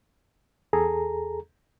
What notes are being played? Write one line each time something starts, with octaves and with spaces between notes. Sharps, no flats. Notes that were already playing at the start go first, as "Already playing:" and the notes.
E2 G#4 A4 A#5